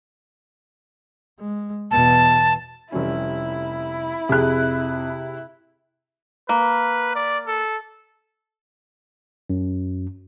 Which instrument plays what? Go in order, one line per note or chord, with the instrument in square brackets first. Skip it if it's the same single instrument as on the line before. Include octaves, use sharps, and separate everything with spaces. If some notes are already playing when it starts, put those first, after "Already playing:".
[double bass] G#3
[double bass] E2 B2 [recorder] A5
[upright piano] F1 G3 C#4 [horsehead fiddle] E4
[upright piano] F2 [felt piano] C3 G#4 F#6
[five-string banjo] A#3 [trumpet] B4
[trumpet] D5
A4
[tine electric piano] F#2